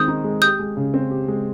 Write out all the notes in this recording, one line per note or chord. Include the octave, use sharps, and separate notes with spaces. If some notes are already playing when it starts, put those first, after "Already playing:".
Already playing: D#3 G#3 C4 D#6 G6
D#4
G#3
G4 D#6 G6
G#3
C#3
C4
G4
G#3